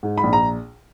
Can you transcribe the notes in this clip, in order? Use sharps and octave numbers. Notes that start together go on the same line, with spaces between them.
G#2
B5
A#1
A#5